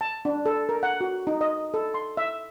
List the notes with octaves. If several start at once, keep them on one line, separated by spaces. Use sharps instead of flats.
A5
D4
A4
A#4
F#5
F#4
D#4
D#5
A4
C6
E5